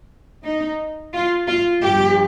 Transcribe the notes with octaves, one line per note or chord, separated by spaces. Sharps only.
D#4
F4
F4
G2 F3 G4